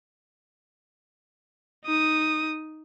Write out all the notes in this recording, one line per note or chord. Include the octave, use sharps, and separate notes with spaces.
D#4 D#6